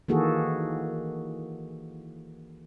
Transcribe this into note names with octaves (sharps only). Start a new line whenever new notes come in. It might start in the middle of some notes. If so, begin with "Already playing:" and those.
D#3 E3 A#3 F#4 G#4 A4